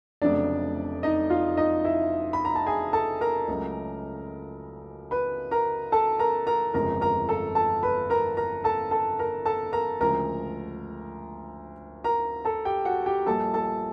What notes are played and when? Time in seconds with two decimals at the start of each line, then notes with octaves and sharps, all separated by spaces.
0.22 F1 F2 C#3 F#3 A3 D4 D5
1.03 D#4 D#5
1.30 F4 F5
1.57 D#4 D#5
1.85 E4 E5
2.33 B5
2.45 A#5
2.55 A5
2.66 G#4 G#5
2.93 A4 A5
3.21 A#4 A#5
3.48 C#2 C#3 F#3 A3
5.11 B4 B5
5.51 A#4 A#5
5.92 A4 A5
6.19 A#4 A#5
6.47 A#4 A#5
6.74 G1 F2 C#3 F3 G#3 A#4 A#5
7.01 A#4 A#5
7.29 A4 A5
7.55 A4 A5
7.83 B4 B5
8.10 A#4 A#5
8.37 A#4 A#5
8.64 A4 A5
8.91 A4 A5
9.19 A#4 A#5
9.46 A4 A5
9.73 A#4 A#5
10.01 D2 C#3 F3 G#3 A#4 A#5
12.04 A#4 A#5
12.45 A4 A5
12.65 G4 G5
12.85 F#4 F#5
13.06 G4 G5
13.26 A#1 A#2 G3 A4 A5
13.54 A4 A5